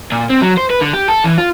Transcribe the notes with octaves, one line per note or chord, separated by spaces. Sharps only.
A#2
C4
F#3
C5
B4
D3
G4
A4
E3
F4